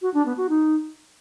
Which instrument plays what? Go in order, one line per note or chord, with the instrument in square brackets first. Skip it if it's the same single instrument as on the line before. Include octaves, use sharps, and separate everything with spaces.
[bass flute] F#4
D4
B3
F#4
D#4